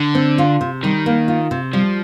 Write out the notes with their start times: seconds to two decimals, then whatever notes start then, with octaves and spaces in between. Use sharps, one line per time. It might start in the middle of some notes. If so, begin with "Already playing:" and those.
Already playing: D3
0.15 C4
0.38 F4
0.61 C3
0.83 D#3 G3
1.06 A#3
1.28 F4
1.51 C3
1.73 F3 G3